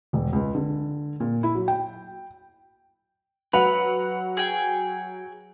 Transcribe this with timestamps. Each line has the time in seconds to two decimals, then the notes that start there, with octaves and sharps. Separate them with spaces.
0.13 E1
0.33 C#2
0.55 D3
1.20 A#2
1.43 E4
1.55 F#3
1.68 G5
3.53 F#3 B4 F#5 F7
4.37 G#4 G5